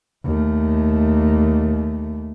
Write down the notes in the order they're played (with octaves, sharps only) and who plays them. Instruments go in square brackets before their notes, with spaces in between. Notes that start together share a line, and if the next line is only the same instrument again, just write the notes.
[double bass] D#2 A3